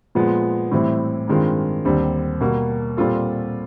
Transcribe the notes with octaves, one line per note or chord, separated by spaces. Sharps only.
A#2 F3 G#3 B3
A2 E3 G3 C4 E4
G2 D#3 G#3 C4 F4
D#2 D3 G3 C4
B2 G3 A#3
A#2 G3 C4 F4 A4